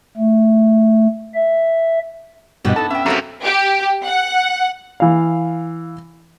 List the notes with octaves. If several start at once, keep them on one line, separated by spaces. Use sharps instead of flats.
A3
E5
G2 B2 B3 D4 E4 F#4 G4 D#5
D#4 A4 A5
C#4 E5 G5
F#2 C3 A4 A#4 F5 A#5
G4
F#5
E3 F5